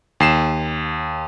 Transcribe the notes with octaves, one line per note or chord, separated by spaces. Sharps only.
D#2 C7 E7